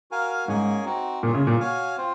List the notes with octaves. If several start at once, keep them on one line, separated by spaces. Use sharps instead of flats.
F#4 A#4 F5 G#5
G#2 A#3 C#4 G#4 C#5 G#5
C4 D#4 F#4
A#2 F4 G#4 C#5
C#3
A#2
F#4 C#5 F5 G#5
C4 F4 C5